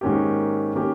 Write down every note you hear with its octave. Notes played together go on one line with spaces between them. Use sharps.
G#2 D#3 A#3 C#4 G4
D#3 A#3 C#4 G4